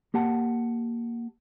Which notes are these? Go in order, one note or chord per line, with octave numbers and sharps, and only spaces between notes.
A#3 G4 F#5 A5